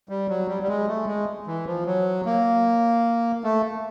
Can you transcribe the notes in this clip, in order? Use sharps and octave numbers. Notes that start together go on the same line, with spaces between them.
G3
F#3
G3
G3
G#3
A3
G#3
E3
F3
F#3
A#3
A3